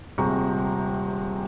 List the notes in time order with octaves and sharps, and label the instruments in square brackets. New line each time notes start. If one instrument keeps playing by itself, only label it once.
[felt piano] D#1 C3 G#3 A#5 C#6